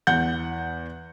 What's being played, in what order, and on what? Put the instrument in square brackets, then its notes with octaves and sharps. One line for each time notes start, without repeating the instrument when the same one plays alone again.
[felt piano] E2 F#5 G6